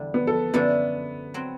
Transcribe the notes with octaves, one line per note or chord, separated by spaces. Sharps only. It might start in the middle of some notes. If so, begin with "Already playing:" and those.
Already playing: E2 D3 G3
B3
A4
F#2 D3 A3 B3 D4 A4
F#3 C4